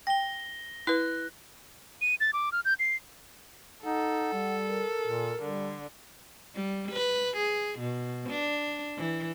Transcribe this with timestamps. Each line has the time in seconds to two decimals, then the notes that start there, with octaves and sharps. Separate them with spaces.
0.07 G5 A#6 G7
0.87 E4 B4 F#6
2.01 D#7
2.20 A6
2.33 D6
2.52 F6
2.65 G6
2.79 C7
3.84 D#4 A4 F#5
4.33 G3
4.67 A#4
5.07 A#2
5.42 D3 G3
6.56 G3
6.91 B4
7.37 G#4
7.79 B2
8.29 D4
8.97 E3